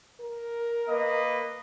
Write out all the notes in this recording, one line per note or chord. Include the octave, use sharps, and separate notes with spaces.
A#4
A#3 B4 D#5